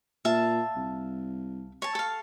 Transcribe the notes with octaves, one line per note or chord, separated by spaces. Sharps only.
A#2 E5 F5 A5
C2
C#5 A5
A4 F5